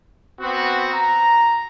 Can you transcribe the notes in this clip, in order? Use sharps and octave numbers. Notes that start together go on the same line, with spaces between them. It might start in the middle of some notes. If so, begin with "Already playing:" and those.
B3 C4 F#4
A#5